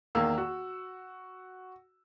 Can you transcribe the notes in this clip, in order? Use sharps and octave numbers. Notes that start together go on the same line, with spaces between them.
E2 D#3 A#3 F5 E6
F#4